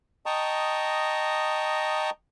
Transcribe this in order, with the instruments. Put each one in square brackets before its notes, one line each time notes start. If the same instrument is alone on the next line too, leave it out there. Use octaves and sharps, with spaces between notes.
[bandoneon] D#5 G5 A5 A#5 C#6 D#6